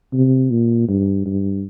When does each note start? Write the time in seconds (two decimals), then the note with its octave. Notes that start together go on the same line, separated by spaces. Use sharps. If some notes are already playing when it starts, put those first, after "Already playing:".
0.13 C3
0.50 A#2
0.88 G2
1.25 G2